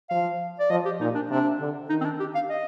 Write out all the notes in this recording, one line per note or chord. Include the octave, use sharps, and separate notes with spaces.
F3 F5
D5
F3 D#5
G4
A#2 D#4
D4
C3 D4
D3
D#3 D#4
C4
D4
G4
F5
D#5